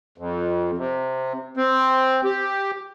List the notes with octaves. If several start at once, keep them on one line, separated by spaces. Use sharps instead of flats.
F2
C3
C4
G4